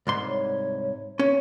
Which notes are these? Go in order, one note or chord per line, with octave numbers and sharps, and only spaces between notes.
C2 G#2 C6
C#5
C#4 C#5